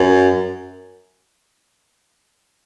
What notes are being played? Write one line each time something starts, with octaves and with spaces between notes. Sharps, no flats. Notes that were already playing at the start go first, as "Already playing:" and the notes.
Already playing: F#2